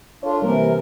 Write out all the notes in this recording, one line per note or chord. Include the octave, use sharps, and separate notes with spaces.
D4 F4 A4 C#5
C3 E3 G3 A#3 C4 A#4